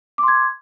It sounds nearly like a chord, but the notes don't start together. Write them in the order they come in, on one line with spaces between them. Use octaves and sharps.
D6 C6 G#6